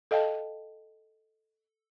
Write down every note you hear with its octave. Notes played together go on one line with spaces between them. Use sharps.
A4 D#5 F5 G5 A5